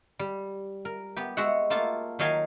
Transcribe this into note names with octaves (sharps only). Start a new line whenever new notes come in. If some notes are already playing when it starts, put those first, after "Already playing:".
G3
A#4
B3 G4
G#3 F#4 E5 F#5
A3 A#3 F4 A5
D#3 F#3 D#5 F5 G#5 A5